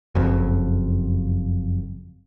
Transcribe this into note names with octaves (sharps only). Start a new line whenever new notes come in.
F#1 F2